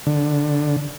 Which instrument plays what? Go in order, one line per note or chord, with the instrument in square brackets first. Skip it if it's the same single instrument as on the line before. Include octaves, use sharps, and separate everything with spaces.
[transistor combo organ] D3